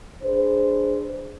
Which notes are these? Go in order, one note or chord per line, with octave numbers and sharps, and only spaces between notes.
D4 G#4 B4 C5